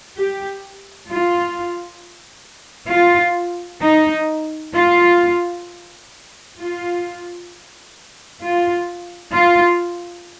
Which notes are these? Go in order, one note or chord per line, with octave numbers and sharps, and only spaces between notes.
G4
F4
F4
D#4
F4
F4
F4
F4